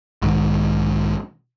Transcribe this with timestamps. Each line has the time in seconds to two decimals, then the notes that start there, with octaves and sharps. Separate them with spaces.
0.22 B1 G#2 D#3